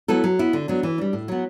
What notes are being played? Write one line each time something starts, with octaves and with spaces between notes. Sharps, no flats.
F#3 B3 E4 A4
F#3
B3 E4
D3
F#3 B3 D4
E3
G3 D4
A2
F#3 B3